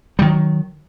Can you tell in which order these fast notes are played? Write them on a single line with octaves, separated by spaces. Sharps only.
G3 D#3 F#3